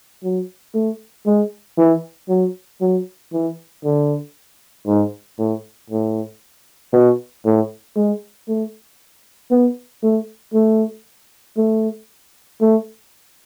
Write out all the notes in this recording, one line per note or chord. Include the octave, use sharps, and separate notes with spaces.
F#3
A3
G#3
E3
F#3
F#3
E3
D3
G#2
A2
A2
B2
A2
G#3
A3
B3
A3
A3
A3
A3